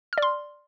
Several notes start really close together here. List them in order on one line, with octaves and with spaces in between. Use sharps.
F6 D5 C6